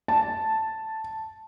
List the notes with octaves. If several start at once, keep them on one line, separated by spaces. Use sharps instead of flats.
A5